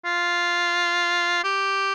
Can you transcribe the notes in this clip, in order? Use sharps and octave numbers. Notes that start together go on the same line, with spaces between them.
F4
G4